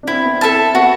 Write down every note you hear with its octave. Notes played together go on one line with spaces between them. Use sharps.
D4
C4 E4
B3
C4 A4 E5 A5
B3 F#4